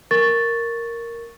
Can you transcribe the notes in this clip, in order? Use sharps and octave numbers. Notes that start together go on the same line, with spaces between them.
A#4 C#6 A6